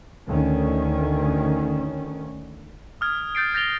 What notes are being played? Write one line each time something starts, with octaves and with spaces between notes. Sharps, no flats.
D2 D#3 C#4
D#6 F6 G#6
G6 A6 C7 D7
G6 A6 A#6 D7 F7 G7